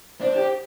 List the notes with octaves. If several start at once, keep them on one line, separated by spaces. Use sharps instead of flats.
D4 C5
G4